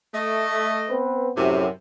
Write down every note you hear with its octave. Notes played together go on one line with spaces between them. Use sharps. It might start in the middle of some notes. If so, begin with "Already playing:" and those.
A3 D#5
B3 C4 B4
F#2 A2 C3